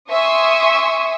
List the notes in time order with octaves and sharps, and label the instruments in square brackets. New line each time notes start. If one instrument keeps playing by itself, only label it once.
[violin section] E5 G#5 C6 C#6 D#6 E6